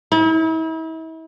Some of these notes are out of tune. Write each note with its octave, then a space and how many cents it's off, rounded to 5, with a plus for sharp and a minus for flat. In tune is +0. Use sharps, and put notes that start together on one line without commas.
E4 -40